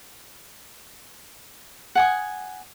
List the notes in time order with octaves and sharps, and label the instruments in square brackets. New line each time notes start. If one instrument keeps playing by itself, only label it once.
[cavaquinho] F#5 G#5 D#6